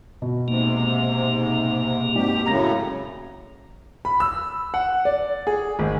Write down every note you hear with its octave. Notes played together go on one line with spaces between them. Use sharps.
B2
G#2 C3 A#3
G#2 B2 C4 G4 D5
F#2 A2 C#3 A#5 A#6
B5
E6
F#5
D5
G#4
G#1